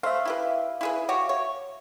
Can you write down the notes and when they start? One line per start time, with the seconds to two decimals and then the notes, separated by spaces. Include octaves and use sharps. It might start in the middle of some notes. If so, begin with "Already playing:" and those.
0.03 A3 C5 E5 F5
0.25 E4 G4 B4
0.81 E4 G#4 B4
1.09 F#4 G4 C#5
1.29 C#5